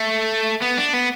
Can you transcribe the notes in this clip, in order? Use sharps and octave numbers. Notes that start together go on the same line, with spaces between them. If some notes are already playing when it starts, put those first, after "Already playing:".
Already playing: A3
B3
D4
B3